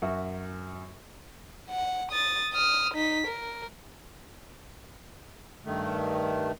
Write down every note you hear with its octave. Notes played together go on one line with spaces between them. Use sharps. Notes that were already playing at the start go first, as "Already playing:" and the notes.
F#2 F#4 E5
F#5
D#6 A6
D#6 F6
D#4 B6
A#4
G2 D#3 A3